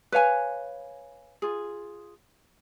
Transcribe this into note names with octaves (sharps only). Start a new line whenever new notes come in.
B4 C#5 F5 G#5
F4 G#4